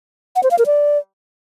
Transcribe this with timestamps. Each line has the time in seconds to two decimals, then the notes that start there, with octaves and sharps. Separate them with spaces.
0.36 F#5
0.43 C5
0.51 F5
0.59 A#4
0.66 D5